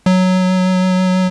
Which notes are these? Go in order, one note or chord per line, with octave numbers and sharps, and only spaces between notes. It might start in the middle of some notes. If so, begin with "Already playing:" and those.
F#3